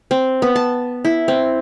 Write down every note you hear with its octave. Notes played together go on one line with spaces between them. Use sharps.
C4
B3
A5
E4
C4